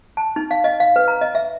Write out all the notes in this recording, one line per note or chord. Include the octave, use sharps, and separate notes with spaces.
A5
D#4
F5
D#5
F5
B4
A#5
D#5
E5